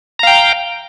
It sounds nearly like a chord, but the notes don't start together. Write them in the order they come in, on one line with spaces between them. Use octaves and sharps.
A#5 F5 G5